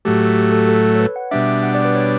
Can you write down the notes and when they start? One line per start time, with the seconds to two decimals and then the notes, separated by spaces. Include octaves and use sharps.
0.05 A2 F#3 A3 G4
0.20 A4
0.36 G4
0.52 A4
0.69 A4
0.95 C#5
1.00 B4
1.16 F#5
1.31 B2 G3 D4 E5
1.63 F#5
1.74 D5
1.85 B4
1.95 C#5